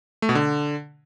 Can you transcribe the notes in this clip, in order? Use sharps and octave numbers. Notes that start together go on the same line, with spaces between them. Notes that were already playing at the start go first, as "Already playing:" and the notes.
A3
B2
D3